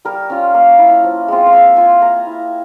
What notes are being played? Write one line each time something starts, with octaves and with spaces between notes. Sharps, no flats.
G3 A#4
C#4 F4
A#3
C#4 E4
F3
G#3 C4 F4
F5
A#3 E5
F4 G#5
A#3 A#5
E4